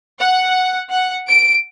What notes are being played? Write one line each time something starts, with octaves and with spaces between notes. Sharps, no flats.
F#5
F#5
D7